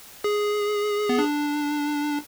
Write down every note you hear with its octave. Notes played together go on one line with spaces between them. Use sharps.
G#4
B3
D4